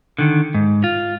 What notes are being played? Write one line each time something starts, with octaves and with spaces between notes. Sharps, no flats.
D3 D#3
G#2
F4